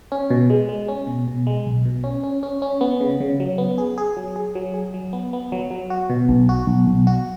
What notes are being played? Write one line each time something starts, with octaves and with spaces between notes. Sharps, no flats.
C#4
B2
G#3
G#3
C#4
B2
B2
G#3
B1
B2
C#4
C#4
C#4
C#4
B3
C#3
C#3
F#3
B3
G#4
G#4
F#3
G#4
F#3
G#4
F#3
B3
B3
F#3
F#3
F#4
B2
B1
F#4
B1
B1
F#4